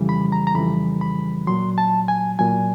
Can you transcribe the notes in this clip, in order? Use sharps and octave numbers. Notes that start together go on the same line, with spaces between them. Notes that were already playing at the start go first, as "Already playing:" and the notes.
Already playing: F2 C#3 E3 G3
B5
A#5
A#5
F2 C#3 E3 G3 B5
B5
A#2 F#3 C6
A5
G#5
A#2 F#3 G#5